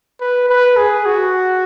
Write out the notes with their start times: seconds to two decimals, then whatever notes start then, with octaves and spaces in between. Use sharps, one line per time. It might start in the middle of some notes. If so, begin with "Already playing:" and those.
0.20 B4
0.49 B4
0.77 G#4
1.06 F#4